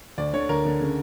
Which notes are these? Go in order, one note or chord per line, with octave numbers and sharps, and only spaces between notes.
D2 D5
D3 C#5
D2 A#4
D3
C#3